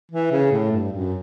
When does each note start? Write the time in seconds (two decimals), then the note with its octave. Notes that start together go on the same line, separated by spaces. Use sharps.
0.11 E3
0.31 C#3
0.52 A2
0.72 G2
0.92 F#2